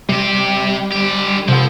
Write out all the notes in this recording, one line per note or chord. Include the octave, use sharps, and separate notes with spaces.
C3 G3 G4
D3 G4
C3 F3 A4 F#5